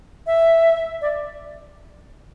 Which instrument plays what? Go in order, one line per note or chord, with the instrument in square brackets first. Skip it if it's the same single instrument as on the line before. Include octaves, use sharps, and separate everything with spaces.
[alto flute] E5
D5